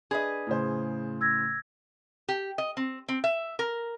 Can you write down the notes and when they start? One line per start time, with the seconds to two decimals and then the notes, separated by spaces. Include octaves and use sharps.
0.11 D4 G#4 B4 D#5
0.47 A2 C#3 C5
1.21 E6 G#6 A#6
2.28 G4
2.58 D#5
2.77 C4
3.09 C4
3.24 E5
3.59 A#4